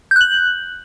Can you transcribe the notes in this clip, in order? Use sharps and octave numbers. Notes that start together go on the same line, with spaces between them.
F#6 G6 F#7